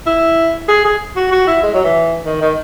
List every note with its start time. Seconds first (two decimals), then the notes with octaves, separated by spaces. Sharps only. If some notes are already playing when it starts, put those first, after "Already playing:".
0.06 E4
0.68 G#4
0.85 G#4
1.16 F#4
1.32 F#4
1.47 E4
1.63 G#3
1.74 F#3
1.84 E3
2.25 D#3
2.41 D#3